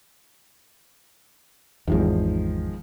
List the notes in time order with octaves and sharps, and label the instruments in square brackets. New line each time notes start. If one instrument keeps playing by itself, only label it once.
[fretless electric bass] G#1 E2 [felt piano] D#3 F3 G#3